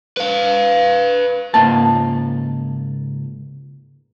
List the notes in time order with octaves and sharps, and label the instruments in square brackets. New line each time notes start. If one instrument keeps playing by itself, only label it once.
[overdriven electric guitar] B4 F5
[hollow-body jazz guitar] C#2 G#2 A#3 A5